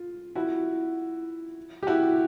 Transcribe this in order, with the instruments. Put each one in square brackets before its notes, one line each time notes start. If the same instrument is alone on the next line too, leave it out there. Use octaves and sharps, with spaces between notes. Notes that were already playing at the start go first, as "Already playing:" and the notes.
Already playing: [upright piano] F4
E4 F#4
G4
E4 F#4